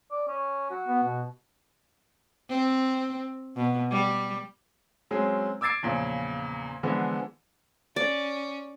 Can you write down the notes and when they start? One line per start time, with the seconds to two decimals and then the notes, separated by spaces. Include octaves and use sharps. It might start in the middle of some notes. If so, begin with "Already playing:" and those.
0.11 D5
0.28 C#4
0.70 F#4
0.87 B3
1.03 B2
2.49 C4
3.56 B2
3.91 G3
5.11 F#3 G#3 C4 C#4 G#4
5.61 D6 E6 G#6 A6 C7 D7
5.83 E2 A#2 C#3 F3
6.83 D3 E3 F3 G#3 B3
7.96 C#4 D5